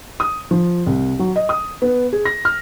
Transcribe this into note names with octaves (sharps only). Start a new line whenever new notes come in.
D#6
F3
C2
F#3
D#5
D#6
B3
G#4
A#6
F6